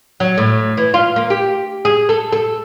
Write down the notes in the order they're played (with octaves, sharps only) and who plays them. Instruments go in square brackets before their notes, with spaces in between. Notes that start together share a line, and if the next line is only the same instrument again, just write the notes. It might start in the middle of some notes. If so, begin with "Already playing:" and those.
[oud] F#3
A2
E3
F4
A#3
G4
G#4
A4
A4